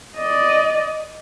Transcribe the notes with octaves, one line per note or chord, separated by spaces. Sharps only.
D5 D#5